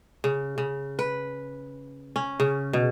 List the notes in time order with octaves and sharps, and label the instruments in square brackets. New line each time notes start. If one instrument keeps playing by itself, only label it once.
[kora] C#3
C#3
B4
C#4
C#3
B2